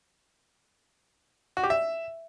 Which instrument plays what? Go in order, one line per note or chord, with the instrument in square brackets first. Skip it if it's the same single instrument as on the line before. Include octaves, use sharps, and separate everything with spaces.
[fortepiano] F#4
G4
E5